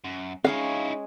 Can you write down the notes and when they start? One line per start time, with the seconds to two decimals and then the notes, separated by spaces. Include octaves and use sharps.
0.04 F#2
0.44 G#3 C#4 D#4 E4 C#5 F5